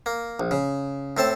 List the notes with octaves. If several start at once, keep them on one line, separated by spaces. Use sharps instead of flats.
A#3
A#1
C#3
A2 C4 A4 A5